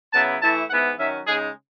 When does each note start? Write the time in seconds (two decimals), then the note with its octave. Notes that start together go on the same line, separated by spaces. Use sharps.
0.13 C#3 F#3 B3 E4 A5
0.42 E3 A3 E4 A5
0.70 G#2 E3 B3 E4 F#5
0.98 D#3 F#3 C#4 E5
1.27 C#3 G#3 D#4 G#4